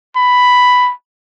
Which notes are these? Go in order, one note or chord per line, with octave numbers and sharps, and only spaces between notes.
B5